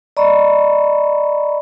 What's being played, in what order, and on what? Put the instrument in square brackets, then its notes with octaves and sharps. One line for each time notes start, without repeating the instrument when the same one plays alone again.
[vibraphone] D5 D#5 A#5 B5 C#6